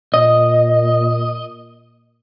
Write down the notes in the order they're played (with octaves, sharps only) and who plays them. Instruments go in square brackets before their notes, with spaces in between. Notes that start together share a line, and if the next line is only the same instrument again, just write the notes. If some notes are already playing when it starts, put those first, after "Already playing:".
[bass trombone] A#2 [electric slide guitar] D#5